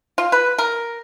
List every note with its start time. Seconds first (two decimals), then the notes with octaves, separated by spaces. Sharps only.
0.18 F4
0.32 B4
0.58 A#4